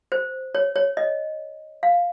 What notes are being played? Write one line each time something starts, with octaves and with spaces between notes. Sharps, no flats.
C5
C#5
C#5
D#5
F5